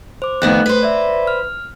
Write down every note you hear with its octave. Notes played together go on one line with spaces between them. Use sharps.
C5 D6
F2 D#3 A3 B3 F#6
B4 C5
D5 E5
F6